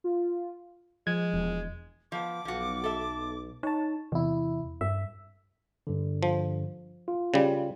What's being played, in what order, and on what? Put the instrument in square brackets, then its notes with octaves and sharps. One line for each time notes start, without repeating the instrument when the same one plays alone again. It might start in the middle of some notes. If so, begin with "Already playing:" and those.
[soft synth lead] F4
[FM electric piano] F3 [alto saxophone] G#3 [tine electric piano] G#6
[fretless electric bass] E1
[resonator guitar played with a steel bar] F3 B3 [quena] D6
[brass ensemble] B1 [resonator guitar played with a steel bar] F3 F#4
[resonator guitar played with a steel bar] A4 E5
[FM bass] D#4 [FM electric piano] C#5 A5
[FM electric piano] E2 E4 [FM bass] C3
[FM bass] G2 [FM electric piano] E5
[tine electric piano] G2 D3
[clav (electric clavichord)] F3
[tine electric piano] F4
[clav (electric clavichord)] C#3 G3